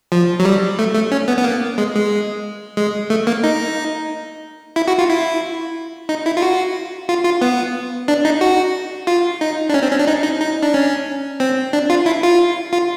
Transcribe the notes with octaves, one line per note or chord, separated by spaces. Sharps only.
F3
F#3
G3
A3
A3
C#4
B3
B3
A#3
G#3
G#3
G#3
A3
A#3
D#4
E4
F#4
F4
E4
D#4
E4
F4
F#4
F4
F4
B3
D4
D#4
F#4
F4
D#4
D4
C#4
C4
C#4
D4
D#4
D#4
D#4
D4
C#4
C4
D4
F4
E4
F4
F4